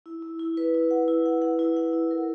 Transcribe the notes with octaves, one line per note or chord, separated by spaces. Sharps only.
E4
E4
E4
B4
E4
F#5
E4
F#5
F#5
E4
F#5
E4
A#4